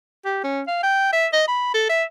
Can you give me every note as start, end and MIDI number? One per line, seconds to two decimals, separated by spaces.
0.25 0.42 67
0.44 0.62 61
0.67 0.80 77
0.83 1.10 79
1.13 1.27 76
1.33 1.45 75
1.47 1.70 83
1.74 1.86 69
1.89 2.04 76